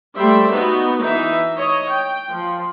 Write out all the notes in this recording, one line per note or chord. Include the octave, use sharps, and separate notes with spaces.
G3 A3 C5 D5 E5
B3 D#4 F#4
E3 D#4 E5
C#5 D#5
G5
F3